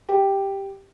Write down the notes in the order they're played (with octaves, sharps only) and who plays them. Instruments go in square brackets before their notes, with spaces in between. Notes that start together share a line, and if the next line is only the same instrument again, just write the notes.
[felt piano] G4